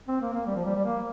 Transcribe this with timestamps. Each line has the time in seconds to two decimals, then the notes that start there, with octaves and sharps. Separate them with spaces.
0.08 C4
0.21 A#3
0.33 A#3
0.46 G3
0.56 F3
0.66 G3
0.76 G3
0.85 A#3